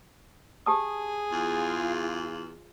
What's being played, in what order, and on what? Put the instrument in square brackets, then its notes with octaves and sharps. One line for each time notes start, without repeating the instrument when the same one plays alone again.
[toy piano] G4 A5 D#6 [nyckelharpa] G#4
[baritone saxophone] E2 [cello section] F4